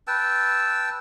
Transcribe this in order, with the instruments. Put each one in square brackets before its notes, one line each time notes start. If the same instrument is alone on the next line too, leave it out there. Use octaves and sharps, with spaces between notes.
[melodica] B4 G5 A5 E6